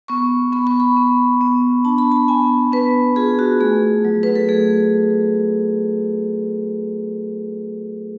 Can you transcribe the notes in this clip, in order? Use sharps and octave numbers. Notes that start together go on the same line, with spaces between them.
B3 C#6
B3 B5
C#6
B5
B3
B3
D4 A5
B5
A5
B3 G#5
B3 B4
F4 G#4
F#4
A3 G#4
F#3
B4
A4
A3 G#4